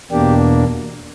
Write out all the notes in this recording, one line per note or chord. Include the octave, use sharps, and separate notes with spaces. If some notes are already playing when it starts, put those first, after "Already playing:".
E2 B2 A#3 D4 G4